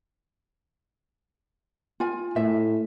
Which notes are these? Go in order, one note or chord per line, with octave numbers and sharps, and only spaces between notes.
F4 G#5
A2 E5